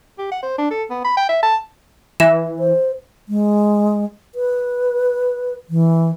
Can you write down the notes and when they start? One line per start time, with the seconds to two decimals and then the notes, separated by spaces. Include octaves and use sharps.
0.19 G4
0.31 F#5
0.43 C5
0.58 D4
0.71 A4
0.90 B3
1.04 B5
1.17 G5
1.29 E5
1.43 A5
2.20 E3 E5 E7
2.59 C5
3.29 G#3
4.35 B4
5.70 E3